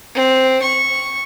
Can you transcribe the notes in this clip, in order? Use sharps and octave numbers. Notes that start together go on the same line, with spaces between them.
C4
C#6